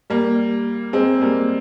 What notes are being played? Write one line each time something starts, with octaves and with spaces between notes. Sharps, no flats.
G3 A#3
G#3 C4
G3 A#3